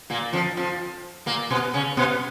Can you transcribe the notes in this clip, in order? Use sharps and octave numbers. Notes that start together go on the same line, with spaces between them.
A#2 A#3
F2 F3
F2 F3
A#2 A#3
B2 B3
C#3 C#4
B2 B3